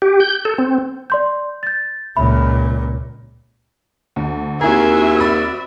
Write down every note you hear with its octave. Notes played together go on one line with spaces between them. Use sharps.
G4
G6
A4
C4
D5 C6 G6
G6 A6
C#2 A#2 E5 B5
D2
D#2 C4 E4 F#4 G#4 A#4 E5
D5 B5